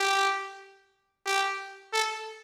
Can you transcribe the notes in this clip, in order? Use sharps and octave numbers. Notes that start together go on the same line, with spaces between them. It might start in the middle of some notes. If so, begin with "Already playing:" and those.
Already playing: G4
G4
A4